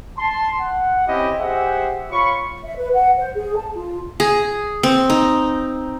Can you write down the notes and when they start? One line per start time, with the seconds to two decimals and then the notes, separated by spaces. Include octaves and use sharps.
0.18 A5 C6
0.60 F#5
1.07 C4 C#4 E4 G4 D#5
1.39 G4 G#4 C5 E5 F#5
2.11 F4 C#5 B5 C#6
2.64 E5
2.77 B4
2.94 F#5
3.18 C5
3.35 G#4
3.56 A5
3.74 F4
4.20 G#4
4.83 C4
5.10 D#4